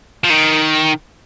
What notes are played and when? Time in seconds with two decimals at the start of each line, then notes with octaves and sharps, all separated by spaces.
0.24 F3
0.30 D#3